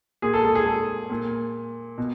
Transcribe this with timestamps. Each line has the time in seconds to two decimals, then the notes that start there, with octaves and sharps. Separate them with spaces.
0.22 A#2 G#4
0.33 A4
0.45 A4
0.55 G#4
0.66 A4
1.10 A#2
1.98 B2